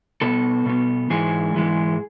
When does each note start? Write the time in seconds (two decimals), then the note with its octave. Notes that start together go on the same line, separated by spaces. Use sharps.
0.21 B2 B3 A4
0.66 B2 B3
1.10 G#2 E3 G#3 G#4
1.54 G#2 E3 G#3